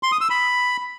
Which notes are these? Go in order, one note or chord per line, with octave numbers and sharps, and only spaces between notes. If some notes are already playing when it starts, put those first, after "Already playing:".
C6
D#6
E6
B5